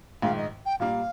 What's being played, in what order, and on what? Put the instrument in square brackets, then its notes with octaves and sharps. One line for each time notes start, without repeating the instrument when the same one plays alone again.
[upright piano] A#1 G#2 D#3 [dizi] F5
[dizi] D#5
G5
[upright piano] A#2 G3 A#3 [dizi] F5